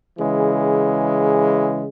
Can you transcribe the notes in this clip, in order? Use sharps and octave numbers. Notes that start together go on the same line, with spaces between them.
C#3 E3 G#3